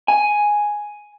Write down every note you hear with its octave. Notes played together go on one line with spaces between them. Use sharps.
G#5